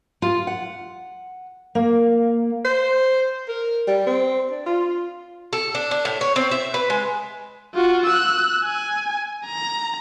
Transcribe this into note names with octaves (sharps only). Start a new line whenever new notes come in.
F4
F#5
A#3
C5
A#4
G3
C4
D4
F4
A4
D4
D4
A2
C#5
C4
E5
B4
G#3
F4 F#4
E6 F#6
G#5
A#5